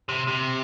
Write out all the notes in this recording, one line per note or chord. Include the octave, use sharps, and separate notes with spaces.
C3
C3